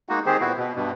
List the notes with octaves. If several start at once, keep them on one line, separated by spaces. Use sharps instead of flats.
G#3 A#3 D#4 F#4
D#3 C4 G4 G#4 C5
A#2 B3 E4 F#4
B2
G2 B2